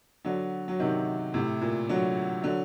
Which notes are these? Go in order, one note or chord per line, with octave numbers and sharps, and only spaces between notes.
D3 F#3
F#3
C3 D#3
A2 C3
A#2
D3 F#3
D3 F#3